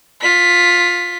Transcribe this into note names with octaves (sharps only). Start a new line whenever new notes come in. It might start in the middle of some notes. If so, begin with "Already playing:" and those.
F4 B6